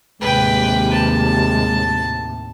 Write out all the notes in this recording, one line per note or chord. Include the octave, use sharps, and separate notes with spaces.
D#2 A2 C3 G#3 B4 G5
A5